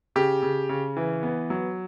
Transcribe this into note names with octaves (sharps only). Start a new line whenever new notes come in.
C#3 G4
C#3
C#3
E3
B3
F#3